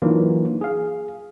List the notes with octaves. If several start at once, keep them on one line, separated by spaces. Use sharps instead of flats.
E3 F#3 A#3 D4 D#4 F4
G#4 F5